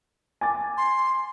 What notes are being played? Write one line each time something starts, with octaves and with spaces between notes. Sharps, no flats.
G#5 D6 A6
C6